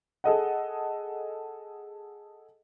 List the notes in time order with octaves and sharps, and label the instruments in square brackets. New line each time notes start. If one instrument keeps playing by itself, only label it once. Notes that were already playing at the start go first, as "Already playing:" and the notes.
[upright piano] G#4 A4 D#5 F#5